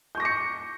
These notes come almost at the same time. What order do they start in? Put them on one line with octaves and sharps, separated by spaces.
G6 C#6 A#6 D6 C#7